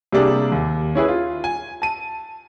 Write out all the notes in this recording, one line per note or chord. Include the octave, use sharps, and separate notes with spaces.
C3 G3 A#3 D4 G#4
D#2
C#4 E4 G#4 B4
F4
G#5
A5 D#7